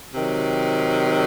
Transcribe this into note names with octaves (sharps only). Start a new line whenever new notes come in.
C3 D#3 F#3